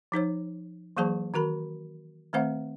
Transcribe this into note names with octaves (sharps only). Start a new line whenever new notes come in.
F3 D#4 C5 C#5
E3 F#3 A#3 G#4 C5 A5
D#3 F#4 A#4 B5
D#3 A3 C4 C5 E5 F#5